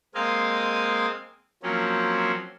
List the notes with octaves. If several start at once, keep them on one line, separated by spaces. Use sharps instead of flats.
G#3 A#3 C4 D#5 F5 G#5
F3 F#3 A#3 C4 C#4